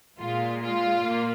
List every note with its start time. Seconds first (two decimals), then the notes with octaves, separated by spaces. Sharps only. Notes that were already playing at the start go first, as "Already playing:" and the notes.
0.19 A#2 G#3 F4
0.62 F4
1.04 A#2 A#3